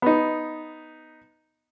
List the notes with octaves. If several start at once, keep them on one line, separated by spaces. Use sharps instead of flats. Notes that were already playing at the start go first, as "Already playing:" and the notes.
B3 D#4